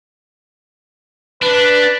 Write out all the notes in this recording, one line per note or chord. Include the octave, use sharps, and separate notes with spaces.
D4 B4